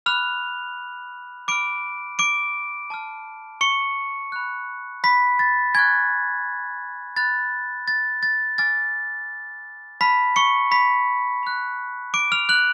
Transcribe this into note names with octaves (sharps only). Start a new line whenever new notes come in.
B5 D6 F6 F#6 F7
B5 D6 F6 D7
D6 D7
A5 D6 F6
C#6 C#7
B5 F#6
B5 B6
A6
G#5 C#6 F#6 G#6
B5 F#6 A6
A6
A6
G#5 D6 F6 A6
A5 B5 F6 B6
C#6 C#7
B5 B6
B5 F#6
D6 D7
F6 F7
F#6 F#7